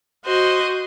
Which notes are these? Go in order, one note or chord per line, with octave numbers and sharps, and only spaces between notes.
F#4 C5 D#5